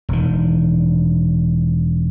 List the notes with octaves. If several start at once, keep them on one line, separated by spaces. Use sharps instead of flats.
E1 D#3